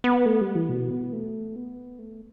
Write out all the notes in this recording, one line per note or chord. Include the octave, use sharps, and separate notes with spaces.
B3
A3
G3
E3
B2
B3
A3
B3
A3